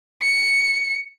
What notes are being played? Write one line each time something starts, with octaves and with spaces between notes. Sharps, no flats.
C#7